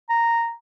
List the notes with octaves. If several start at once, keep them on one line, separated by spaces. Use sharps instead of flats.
A#5